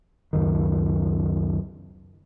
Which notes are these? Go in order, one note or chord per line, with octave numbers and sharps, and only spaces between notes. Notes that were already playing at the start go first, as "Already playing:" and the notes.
C#2 F#2 D#3